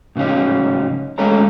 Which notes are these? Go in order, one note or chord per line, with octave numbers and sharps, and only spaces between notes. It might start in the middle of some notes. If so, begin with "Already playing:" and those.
A2 C#3 F#3 C#4 D#4
G#3 A3 C#4 A4 C#5 A#5